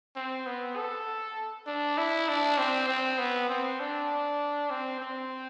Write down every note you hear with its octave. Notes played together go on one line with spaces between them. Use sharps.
C4
B3
A4
D4
E4
D4
C4
C4
B3
C4
D4
C4
C4